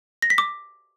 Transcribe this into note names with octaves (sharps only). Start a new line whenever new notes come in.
A#6
B6
D6